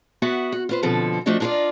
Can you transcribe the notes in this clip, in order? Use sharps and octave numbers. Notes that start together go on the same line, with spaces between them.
B3 F#4 E5 F#5
F#4
F4 B4 C5
B2 D3 F3 C4 A4
F3 A3 D4 F#4 A4 D#5
D4 D#4 F4 G4 A#4 D5